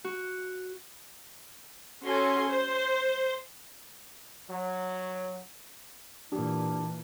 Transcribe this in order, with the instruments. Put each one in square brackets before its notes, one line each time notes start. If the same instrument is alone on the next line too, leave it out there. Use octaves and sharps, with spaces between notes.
[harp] F#4
[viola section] C#4 F#4 A4 G#5 C6
C5
[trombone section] F#3
[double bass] A#2 E3 [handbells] D4 G4